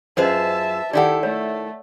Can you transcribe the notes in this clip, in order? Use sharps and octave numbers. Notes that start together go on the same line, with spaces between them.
F#2 F4 G#4 B4 C5 D#5 E5 A5
D#3 E4 G4 A4 D5 F#5
A3 C#5